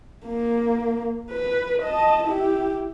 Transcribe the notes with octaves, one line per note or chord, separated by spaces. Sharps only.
A#3
B4
D#5 A5
E4 G4